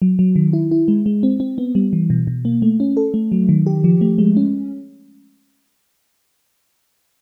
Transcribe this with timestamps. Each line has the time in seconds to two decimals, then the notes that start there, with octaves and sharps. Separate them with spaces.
0.02 F#3
0.19 F#3
0.36 D#3
0.53 E4
0.71 E4
0.88 G#3
1.06 G#3
1.23 C4
1.40 C4
1.58 B3
1.75 G3
1.93 E3
2.10 B2
2.27 B2
2.45 A#3
2.62 A3
2.80 C#4
2.97 A4
3.14 A3
3.32 F#3
3.49 D#3
3.66 G4
3.84 F3
4.01 A3
4.18 G#3
4.37 C#4